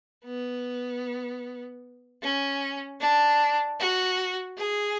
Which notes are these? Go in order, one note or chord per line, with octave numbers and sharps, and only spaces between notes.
B3
C#4
D4
F#4
G#4